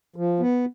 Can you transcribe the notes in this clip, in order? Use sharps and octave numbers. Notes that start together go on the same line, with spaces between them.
F3
B3